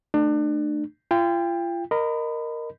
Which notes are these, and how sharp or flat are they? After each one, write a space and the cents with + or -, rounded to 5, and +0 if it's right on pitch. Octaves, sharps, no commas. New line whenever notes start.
A3 +0 D4 +30
F4 -35 G5 +20
A#4 +0 D#5 -20 B5 +25